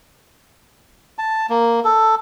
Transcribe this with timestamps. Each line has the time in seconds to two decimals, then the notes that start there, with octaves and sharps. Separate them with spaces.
1.18 A5
1.50 A#3
1.85 A4